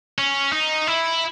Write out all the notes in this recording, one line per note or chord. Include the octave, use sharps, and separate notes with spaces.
C#4
D#4
E4